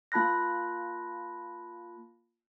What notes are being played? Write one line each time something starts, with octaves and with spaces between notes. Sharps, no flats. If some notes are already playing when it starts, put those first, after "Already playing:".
A#3 F4 A5 B5 F#6 A#6